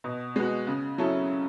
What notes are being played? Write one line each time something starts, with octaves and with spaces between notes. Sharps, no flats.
B2
G#3 B3 F#4
C#3
F#3 C#4 E4 A4